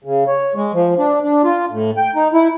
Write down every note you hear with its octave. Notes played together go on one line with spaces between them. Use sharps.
C#3
C#5
G#3
F3
D4
D4
F4
A2
G5
D#4
E4